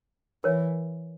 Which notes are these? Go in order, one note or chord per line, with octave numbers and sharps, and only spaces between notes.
E3 A#4 C#5 E5